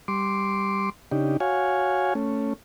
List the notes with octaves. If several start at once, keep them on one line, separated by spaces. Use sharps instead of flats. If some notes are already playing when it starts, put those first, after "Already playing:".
G3 C6 D6
C#3 D4 D#4 G4
F#4 C#5 F5 G#5
A3 C#4